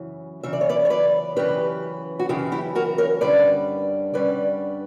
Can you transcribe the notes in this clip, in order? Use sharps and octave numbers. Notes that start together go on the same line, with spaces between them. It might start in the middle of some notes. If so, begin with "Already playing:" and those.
Already playing: F#2 C#3 E3
F#2 C#3 E3 E5
D5
C#5
B4 D5
C#5
B4 D5
F#2 C#3 E3 G4 B4
F#4
F#2 C#3 E3 E4 G4
E4 G4
F#4 A#4
A#4 C#5
G2 D3 G3 C#4 B4 D5
G2 D3 G3 C#4 B4 D5